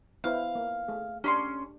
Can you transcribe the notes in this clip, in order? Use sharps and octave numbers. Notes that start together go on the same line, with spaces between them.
B3 E4 C5 F5
A#3
A3 G#4
C#4 D4 G4 B5 C6